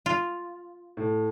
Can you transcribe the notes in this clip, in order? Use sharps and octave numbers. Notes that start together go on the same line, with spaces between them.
F4
A2